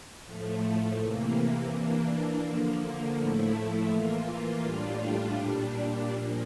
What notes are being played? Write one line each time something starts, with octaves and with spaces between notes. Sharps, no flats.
A2 F3 A3
C3 E3 A#3
E3 A#3 D4
D3 F3 A#3
A2 F3 A3 E4
E3 A#3 F4
A2 G3 D4 F4
A#2 G3 D4
A#2 F3 A#3